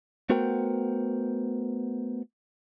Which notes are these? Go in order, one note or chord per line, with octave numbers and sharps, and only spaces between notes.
A3 B3 F#4 A#4 C5 G5